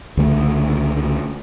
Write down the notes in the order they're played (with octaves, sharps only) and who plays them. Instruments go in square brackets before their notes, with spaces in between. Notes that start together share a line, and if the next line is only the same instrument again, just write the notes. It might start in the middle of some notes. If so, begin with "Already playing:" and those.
[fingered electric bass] C#2 D3 A3